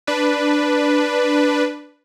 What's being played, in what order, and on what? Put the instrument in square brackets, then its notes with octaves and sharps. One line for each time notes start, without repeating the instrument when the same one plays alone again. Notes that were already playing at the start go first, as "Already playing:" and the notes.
[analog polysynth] D4 B4